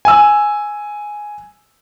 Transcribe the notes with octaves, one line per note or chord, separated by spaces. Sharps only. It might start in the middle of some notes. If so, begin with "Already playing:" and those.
G#5 E6